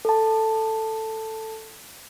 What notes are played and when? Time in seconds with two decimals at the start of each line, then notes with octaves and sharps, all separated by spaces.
0.05 A4 A5